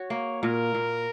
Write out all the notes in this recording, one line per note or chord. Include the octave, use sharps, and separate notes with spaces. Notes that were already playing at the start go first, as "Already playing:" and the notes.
Already playing: F#4 C#5
A#3
A#2 A#4
A#2